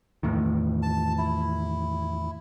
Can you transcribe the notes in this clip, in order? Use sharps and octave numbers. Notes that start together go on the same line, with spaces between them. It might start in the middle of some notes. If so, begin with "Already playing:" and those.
E2 A2 D#3
A5
E4